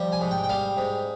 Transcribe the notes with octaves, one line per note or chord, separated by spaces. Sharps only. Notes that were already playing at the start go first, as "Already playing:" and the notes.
Already playing: F3 G3
G#5
G#2
G5
G5
G3 F5
G#2